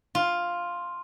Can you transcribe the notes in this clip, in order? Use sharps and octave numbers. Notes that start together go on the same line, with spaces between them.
F4